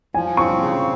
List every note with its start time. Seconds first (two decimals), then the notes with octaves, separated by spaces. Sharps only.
0.14 F3 G#5
0.37 C4 C#6
0.61 C#3